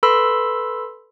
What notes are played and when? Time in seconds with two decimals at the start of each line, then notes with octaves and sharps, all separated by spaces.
0.03 A4 B4 B5 C6 E6